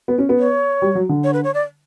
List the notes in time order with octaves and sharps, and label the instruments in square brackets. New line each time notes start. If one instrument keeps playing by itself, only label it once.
[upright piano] B3
C#4
B3
[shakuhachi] C#5
[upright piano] G3
F#3
D3
[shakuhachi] C#5
B4
C#5
D5